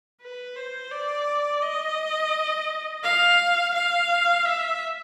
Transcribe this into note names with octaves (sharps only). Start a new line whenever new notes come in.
B4
C5
D5
D#5
F5
F5
E5